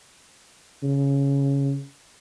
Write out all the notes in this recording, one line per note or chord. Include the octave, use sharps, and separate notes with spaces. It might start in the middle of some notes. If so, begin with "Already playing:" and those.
C#3